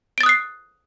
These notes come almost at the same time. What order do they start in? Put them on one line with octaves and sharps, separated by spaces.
D7 A6 D#6 F#6 C7